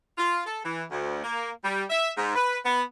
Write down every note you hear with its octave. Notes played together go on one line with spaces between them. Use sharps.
F4
A4
E3
D2
A#3
G3
E5
G#2
B4
B3